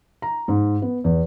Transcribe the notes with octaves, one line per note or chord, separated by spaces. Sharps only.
A#5
G#2
B3
E2